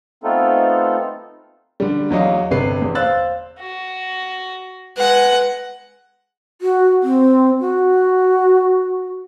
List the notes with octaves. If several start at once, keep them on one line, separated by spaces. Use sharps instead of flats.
A3 B3 C4 D#4 F4 A4
D3 G3
E2 F#3 D#5 F5
G1 C3 B4 C7
E2
C5 F5 E6 F#6 A6
F#4
G#3 B4 F#5 F#6
F#4
C4
F#4